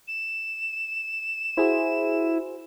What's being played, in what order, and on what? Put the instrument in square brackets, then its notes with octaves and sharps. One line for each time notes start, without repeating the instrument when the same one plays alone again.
[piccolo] E7
[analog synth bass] E4 [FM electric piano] F#4 G#4 C5